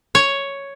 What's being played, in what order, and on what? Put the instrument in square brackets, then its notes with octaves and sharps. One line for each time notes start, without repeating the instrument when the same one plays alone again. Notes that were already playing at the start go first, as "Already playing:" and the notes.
[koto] C#5